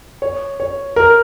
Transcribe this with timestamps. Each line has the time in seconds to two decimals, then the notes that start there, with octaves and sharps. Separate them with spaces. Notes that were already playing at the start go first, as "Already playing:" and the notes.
0.22 C#5
0.60 C#5
0.96 A#4